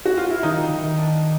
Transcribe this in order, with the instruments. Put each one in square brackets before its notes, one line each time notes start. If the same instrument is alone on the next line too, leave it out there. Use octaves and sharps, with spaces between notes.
[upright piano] F#4
F4
E4
[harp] D#3 [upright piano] D#4
[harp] D#3
D4